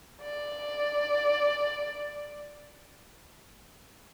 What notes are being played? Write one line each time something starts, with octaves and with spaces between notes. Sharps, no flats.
D5